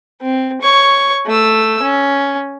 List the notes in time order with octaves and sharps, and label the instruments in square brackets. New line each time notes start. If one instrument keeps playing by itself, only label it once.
[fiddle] C4
C#5 C#6
A3 E6
C#4